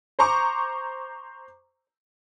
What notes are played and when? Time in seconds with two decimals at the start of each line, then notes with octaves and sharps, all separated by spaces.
0.19 C5 A#5 C#6 D6